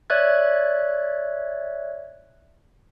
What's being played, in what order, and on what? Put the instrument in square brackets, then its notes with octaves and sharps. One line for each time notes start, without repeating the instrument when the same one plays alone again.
[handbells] C#5 D5 E5 F#6 G#6